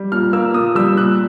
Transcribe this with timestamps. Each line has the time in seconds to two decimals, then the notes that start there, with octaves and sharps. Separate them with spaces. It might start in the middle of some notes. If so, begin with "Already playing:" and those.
Already playing: G3
0.12 A#2 F6
0.33 A#3 E6
0.54 A#2 D#6
0.75 G3 E6
0.97 A#2 F#6